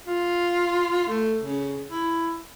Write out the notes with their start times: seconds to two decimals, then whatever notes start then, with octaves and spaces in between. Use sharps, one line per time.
0.06 F4
1.08 A3
1.40 C#3
1.89 E4